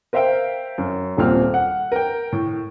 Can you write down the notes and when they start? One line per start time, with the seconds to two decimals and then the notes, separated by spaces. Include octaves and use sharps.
0.13 A#4 C5 E5 F5 G5
0.78 F#2
1.17 D#1 A#2 C4 F6
1.54 F#5
1.92 A#4 G5
2.32 A2